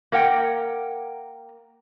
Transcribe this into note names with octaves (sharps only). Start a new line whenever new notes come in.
A#3 A#4 F#5 G5